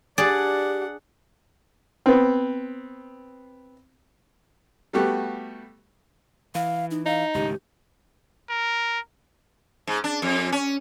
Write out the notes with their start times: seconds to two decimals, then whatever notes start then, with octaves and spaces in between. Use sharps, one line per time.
0.18 D4 G4 G#4 D5 F#5 A5
2.06 B3 C4
4.93 G3 A3 B3 F#4 G4 A4
6.55 E3 F5
6.91 D#4
7.06 D#4 F5
7.35 C#2 A2 D#3 G4
8.49 A#4
9.87 G#2
10.04 D4
10.22 F2
10.52 C#4